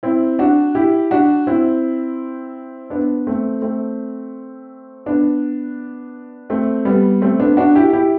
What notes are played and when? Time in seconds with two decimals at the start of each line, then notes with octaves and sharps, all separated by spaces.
0.03 C4 E4
0.39 D4 F#4
0.75 E4 G4
1.11 D4 F#4
1.47 C4 E4
2.90 B3 D4
3.27 A3 C4
3.62 A3 C4
5.06 B3 D4
6.50 A3 C4
6.85 G3 B3
7.22 A3 C4
7.40 B3 D4
7.57 D4 F#4
7.75 E4 G4
7.93 E4 G4